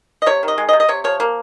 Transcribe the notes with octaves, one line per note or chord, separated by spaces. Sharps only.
D#5
C3 C#5
D#3
D#5
G#3
D#5
C3
D#5
C3 C#5
F3 C#5
A#3